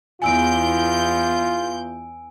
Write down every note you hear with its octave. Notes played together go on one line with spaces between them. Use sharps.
E2 F4 G#5 E6 G6 D7